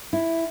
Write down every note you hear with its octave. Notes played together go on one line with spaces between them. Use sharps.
E4